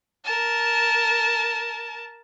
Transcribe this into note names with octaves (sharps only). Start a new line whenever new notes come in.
A#4 A5